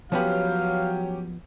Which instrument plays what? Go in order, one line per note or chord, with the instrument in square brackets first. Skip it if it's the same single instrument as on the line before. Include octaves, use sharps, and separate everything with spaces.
[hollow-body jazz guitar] F3 B3 B4 [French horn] F#3 [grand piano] C#4 G4 [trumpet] F5